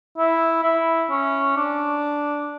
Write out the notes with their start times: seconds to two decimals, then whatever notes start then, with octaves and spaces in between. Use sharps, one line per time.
0.18 E4
0.64 E4
1.11 C#4
1.57 D4